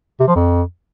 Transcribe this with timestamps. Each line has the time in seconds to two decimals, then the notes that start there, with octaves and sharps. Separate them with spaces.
0.20 C3
0.28 F3
0.35 F2